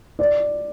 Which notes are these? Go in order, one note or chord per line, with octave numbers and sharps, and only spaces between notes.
D5